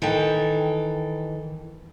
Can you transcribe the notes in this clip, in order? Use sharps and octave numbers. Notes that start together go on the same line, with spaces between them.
D#3 E3 A4 G5